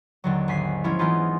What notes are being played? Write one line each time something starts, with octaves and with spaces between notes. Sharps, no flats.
D#2 D3 F#3
G#1 G#5 B6 C7
F3 G#3 C#4 E4
E3 A#3 B3 D#4 F4